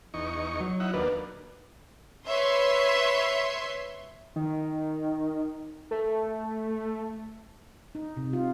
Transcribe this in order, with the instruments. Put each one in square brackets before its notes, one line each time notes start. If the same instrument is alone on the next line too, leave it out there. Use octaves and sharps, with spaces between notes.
[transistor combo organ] E2 D#4 C#6
[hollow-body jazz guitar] F#3
[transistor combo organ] D#4 E4 F#5
[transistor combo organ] D#2 A#3 D4 [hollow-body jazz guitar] B4
[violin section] B4 C#5 E5 C6
[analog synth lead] D#3
A3
[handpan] D#4
C3
F4